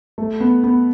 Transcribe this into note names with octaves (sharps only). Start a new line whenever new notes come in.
A3
B3
B3